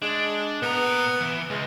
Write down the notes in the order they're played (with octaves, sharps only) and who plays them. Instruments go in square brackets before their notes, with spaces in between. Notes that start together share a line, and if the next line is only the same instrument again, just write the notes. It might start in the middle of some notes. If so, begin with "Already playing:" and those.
[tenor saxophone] G#3 [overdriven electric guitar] D4
[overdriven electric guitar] A#2 A#5 [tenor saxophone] B3
[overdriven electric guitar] E3
[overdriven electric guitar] C#2 [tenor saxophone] G#3